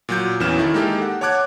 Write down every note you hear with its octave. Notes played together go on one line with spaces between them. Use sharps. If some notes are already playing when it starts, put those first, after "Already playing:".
A#2 F#3 G6
G1 E2 E3 C#4 F6 E7
D#3 E4 A4
G#3 A#3 D#4 G4 A4
F#5
C#5 F#5 A5 D6 F#6 G#6